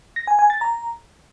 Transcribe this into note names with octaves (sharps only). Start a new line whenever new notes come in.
A#6
G#5
G#5
A6
A#5